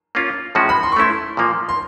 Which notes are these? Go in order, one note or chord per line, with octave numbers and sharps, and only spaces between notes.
A#3 C#4 F4
A2 F3 G#3 C#4 F#4
B5
C6
C#6
A3 C#4 E4 C6
A#2 F3 A#3
C6